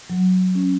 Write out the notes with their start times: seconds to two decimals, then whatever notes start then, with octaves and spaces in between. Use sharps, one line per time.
0.10 F#3
0.55 C#4